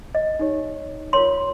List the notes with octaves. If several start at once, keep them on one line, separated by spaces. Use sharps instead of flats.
D#5
D#4 G4 C#5
F4 A#4 C#5 C6